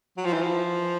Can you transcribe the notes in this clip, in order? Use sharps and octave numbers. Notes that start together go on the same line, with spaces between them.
F#3
F3
E3
F3